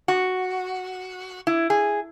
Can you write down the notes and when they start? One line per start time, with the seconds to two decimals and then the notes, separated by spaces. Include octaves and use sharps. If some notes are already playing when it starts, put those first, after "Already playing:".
0.08 F#4
1.47 E4
1.70 G#4